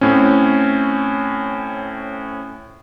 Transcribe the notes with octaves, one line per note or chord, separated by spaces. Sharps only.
A2 C4 C#4